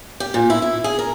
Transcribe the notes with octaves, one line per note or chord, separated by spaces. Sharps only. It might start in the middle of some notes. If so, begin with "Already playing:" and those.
G4
A#2
E4
E4
G#4
A#4